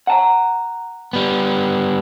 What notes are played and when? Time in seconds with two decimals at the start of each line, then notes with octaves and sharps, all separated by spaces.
0.07 F#5 A5 A#5
1.13 G3 B3